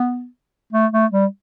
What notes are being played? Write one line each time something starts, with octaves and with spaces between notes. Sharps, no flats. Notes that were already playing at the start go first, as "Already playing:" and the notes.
Already playing: B3
A3
A3
G3